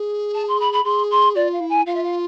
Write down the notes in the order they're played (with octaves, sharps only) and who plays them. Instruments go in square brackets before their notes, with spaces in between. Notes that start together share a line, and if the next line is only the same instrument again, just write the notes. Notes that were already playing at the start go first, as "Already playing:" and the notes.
Already playing: [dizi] G#4
[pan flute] A5
C6
B5
B5
[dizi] G#4 [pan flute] C6
[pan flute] C6
[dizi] F4 [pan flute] D5
[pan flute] F5
[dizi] E4
[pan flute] G#5
[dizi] F4 [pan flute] F5
[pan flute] E5
F5